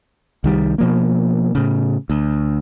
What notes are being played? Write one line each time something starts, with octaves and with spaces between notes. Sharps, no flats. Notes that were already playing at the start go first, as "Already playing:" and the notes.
C2 D#3 G3
B2 F3 A#3
A2 C#3
D2